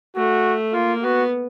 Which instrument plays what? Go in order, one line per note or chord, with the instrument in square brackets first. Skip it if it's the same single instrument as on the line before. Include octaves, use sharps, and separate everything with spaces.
[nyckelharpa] A3 [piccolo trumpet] F#4
[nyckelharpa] A#3 [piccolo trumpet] F4
[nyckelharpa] B3 [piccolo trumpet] F#4